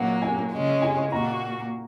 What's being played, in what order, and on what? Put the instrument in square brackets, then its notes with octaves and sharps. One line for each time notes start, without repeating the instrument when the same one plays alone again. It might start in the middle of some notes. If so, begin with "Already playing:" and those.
Already playing: [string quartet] A#2 F#3 A#3 [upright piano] F#5
[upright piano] G#5
[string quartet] C#3 G#3 C#4
[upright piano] G#5
[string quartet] A#2 A#3 F#4 [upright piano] A#5